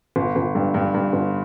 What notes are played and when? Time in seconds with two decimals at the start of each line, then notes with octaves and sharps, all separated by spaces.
0.16 G1
0.36 G1
0.55 G2
0.74 G2
0.94 G2
1.13 G1